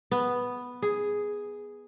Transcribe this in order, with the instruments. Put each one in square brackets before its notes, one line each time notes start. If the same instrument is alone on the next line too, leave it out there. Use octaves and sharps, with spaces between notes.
[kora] B3
G#4